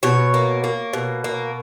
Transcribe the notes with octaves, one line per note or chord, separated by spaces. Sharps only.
B2 C#5
A#3
A#3
B2
A#3